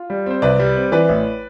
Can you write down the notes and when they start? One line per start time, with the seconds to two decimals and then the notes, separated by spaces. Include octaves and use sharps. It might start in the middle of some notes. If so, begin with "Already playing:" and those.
Already playing: F4
0.10 G3
0.26 C4 C5
0.42 C2 B4 D5
0.59 G3
0.76 C4
0.92 E3 B4 D5
1.09 A1